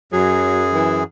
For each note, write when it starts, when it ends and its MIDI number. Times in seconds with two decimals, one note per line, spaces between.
0.12 1.03 42
0.12 0.68 54
0.12 1.03 68
0.74 1.02 52